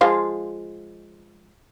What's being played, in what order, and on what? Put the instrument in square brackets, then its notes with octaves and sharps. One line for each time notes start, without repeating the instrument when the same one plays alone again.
[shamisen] F3 G#3 F4